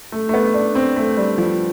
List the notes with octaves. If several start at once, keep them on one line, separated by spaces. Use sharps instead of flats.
A3
A3
B3
D4
C4
A3
G3
F3